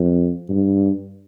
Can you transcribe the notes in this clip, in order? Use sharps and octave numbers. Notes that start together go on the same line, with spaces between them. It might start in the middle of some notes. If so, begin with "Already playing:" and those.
Already playing: F2
G2